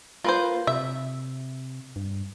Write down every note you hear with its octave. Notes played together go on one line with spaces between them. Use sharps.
A#3 F4 B4 C5
C3 E5
G2